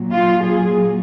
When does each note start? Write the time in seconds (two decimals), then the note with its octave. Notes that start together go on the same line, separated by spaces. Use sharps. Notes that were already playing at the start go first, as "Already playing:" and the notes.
Already playing: A#2 F#3
0.13 F4
0.43 G#4